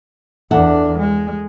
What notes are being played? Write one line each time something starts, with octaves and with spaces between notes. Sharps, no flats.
E2 D4 A4 E5 F#5
G#3